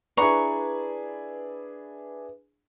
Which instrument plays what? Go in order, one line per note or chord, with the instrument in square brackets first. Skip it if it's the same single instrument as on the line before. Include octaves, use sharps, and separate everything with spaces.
[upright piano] D4 E4 G#4 [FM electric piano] B4 [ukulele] A#5 [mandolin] C#6